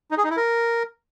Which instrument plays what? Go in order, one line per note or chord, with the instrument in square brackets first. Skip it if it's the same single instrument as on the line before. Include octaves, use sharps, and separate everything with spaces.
[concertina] D#4
G#4
D#4
E4
A#4